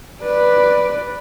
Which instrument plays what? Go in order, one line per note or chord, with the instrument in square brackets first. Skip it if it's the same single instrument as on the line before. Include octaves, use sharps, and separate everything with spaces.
[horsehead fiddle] B4 D5